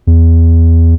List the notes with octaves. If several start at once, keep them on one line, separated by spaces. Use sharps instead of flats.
E2